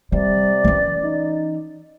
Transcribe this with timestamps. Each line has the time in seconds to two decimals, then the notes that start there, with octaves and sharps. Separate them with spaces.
0.12 C3 G3 D5
0.64 E3 C#4
1.04 D#4